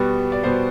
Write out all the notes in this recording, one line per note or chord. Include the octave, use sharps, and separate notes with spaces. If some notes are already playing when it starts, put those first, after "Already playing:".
Already playing: B2 G3 B3 F#4
D5
B2 G3 B3 C5